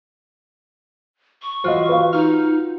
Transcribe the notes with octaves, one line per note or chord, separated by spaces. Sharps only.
C#6
E3 F4 F#4 C5 D#5
B4 F5
D#4 F6